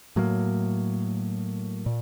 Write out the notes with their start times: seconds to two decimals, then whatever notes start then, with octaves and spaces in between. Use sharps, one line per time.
0.16 A2 F#3 A#3
1.86 A#2